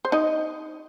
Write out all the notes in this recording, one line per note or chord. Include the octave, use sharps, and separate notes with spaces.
C5
D#4 D#5